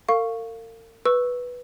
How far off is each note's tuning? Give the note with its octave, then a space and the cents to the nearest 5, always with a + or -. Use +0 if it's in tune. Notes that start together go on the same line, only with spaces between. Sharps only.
A#4 -45 F5 +0 C#6 +0
B4 -5 C#6 -5 E6 +0